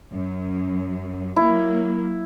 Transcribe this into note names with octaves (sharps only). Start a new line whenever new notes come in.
F#2
F#3 A#3 E4